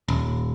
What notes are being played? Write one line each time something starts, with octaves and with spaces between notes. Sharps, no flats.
D#1